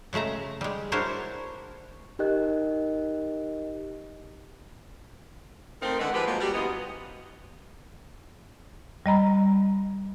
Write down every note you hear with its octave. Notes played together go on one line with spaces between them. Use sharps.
C#3 G#3 A3 E5 A#5
G3 G#3
D4 E4 F#4 A#4 C5 C#5
D#4 G4 A#4 D#5 F#6
A3 C4 D#4 F4 A#4
D3 D#3 G#3 A4 B4 F#5
F3 G#3 G4 B4
F3 F#3 G#3 A#3
G3 F#4
F#2 E3 B3 F4 D#5
G3 D#5 A#5 B5